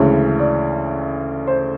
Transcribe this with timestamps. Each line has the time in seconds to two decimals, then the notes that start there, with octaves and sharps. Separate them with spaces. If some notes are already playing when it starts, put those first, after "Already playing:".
Already playing: D2 C#3 E3 G#3 C#5
0.39 D5
1.47 C5